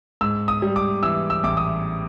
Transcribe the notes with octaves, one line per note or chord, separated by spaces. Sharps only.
G#2 E6
D#6
G3
D6
E3 E6
E6
A1 D6
D#6